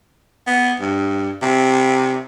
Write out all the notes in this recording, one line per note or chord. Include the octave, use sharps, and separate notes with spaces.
B3
G2
C3